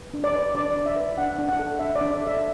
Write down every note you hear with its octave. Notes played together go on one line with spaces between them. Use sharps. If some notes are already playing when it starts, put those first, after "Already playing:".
Already playing: B4
D4
D5
B4
D4 D5
D4
E5
B4
D4 F#5
D4
F#5
A4
D4 E5
D5
D4
E5
A4
E5